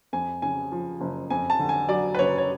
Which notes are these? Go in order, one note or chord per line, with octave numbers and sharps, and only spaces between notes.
F2 G#5
C#3 G#5
F3
F#1
F2 G#5
A5
D3
G#5
F#3 D5
B4
F#1 C#5
C#5